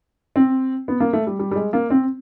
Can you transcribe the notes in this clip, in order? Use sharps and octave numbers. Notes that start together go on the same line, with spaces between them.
C4
B3
A#3
A3
G3
G3
G3
G#3
A#3
C4